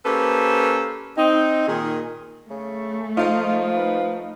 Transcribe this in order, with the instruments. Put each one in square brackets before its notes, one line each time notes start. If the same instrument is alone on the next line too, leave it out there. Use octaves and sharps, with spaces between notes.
[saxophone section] A#3 C#4 G4 A4 B4 C5
C4 D#4
A#2 D#3 G#4
[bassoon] C#3 [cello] A3
[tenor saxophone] F3 [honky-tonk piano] D#4 F5 [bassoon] F4
[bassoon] B4